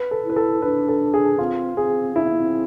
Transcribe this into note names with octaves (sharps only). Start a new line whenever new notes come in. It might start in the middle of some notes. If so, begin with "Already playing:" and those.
Already playing: B4
A4
E4
B4
A4
D4 B4
A4
G#4
C4 F4
C4 G#4
D4 E4
C4
B3
C4